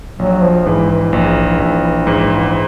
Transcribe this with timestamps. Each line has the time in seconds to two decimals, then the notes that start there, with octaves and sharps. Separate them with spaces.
0.19 A#1 F#3
0.42 F3
0.66 G#2 E3
0.89 E3
1.13 A#1
1.60 A#1
2.07 G#2